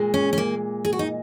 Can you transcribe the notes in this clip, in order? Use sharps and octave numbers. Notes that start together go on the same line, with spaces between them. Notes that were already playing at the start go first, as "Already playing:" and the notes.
Already playing: A#2 G#3
C#4
C#4
A#3
G#4
F#4
D#4